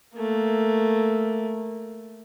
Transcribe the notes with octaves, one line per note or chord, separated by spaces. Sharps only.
A3 A#3